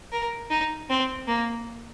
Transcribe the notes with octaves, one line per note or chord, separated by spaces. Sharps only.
A#4
D#4
C4
A#3